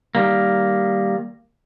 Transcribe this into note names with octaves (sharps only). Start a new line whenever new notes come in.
D#3 G3 A#3